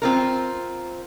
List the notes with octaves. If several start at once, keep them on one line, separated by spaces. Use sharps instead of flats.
C4 F4 A#4